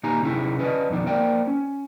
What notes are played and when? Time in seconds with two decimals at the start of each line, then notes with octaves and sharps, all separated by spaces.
0.03 A#2 A#3 D#4 G4 G#5 A#5
0.22 C3 C#4 D#4 E4 G#4
0.59 C#4 D4 B4 D#5
0.90 F2 B2 D#3 D4
1.06 A#3 A#4 C5 D5 G5
1.47 C#4